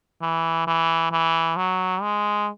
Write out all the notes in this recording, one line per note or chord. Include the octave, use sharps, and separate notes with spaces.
E3
E3
E3
F#3
G#3